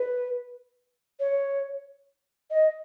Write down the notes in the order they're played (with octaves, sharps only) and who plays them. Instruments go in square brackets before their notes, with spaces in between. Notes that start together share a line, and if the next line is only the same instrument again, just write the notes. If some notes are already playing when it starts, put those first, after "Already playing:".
Already playing: [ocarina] B4
C#5
D#5